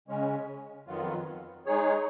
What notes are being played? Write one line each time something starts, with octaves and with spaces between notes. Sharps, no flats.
C#3 G#3 C#4
F2 D#3 F#3 B3 F4
G#3 D#4 G#4 C#5